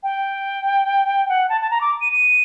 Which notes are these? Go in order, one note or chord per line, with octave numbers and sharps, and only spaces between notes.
G5
F#5
A5
A5
A#5
D6
D#7
D#7